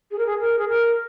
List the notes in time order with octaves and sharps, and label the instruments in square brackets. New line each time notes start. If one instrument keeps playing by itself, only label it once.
[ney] G#4
A#4
G#4
A#4
G#4
A#4